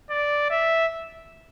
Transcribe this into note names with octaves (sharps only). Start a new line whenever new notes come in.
D5
E5